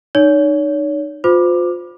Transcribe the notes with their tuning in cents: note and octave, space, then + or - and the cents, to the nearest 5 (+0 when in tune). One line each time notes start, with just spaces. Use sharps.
D#4 -30 C#5 +35
F4 +30 C5 -30 D6 +15